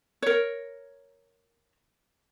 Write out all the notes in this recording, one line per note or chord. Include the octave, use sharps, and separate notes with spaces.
A#4 C#5